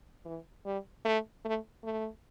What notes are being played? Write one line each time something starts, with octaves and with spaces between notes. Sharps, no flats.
E3
G3
A3
A3
A3